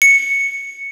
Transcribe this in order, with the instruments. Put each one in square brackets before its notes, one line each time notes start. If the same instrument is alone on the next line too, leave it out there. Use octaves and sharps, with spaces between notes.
[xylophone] C#7